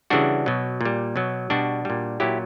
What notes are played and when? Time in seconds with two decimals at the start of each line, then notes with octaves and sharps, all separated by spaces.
0.10 C#3 E3 G3 D4 F#4
0.46 B2 F#3
0.81 A#2 G3
1.16 B2 F#3
1.50 B2 G3 D4 F#4
1.85 A#2 G3
2.20 A#2 F#3 E4 G4